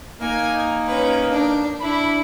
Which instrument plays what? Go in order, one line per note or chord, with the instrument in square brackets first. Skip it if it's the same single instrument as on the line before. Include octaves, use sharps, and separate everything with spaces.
[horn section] A#3 D#4 [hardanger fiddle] G#5
[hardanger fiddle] C#4 B4
D4
[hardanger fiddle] D4 E4 [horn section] B5